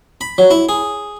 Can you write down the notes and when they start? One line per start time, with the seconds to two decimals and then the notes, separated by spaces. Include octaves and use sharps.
0.21 B5
0.38 F#3
0.51 E4
0.69 G#4